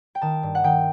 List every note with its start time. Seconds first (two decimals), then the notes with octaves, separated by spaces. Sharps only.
0.15 G5
0.21 D#3 A5
0.43 G2
0.55 F#5
0.64 D#3 G5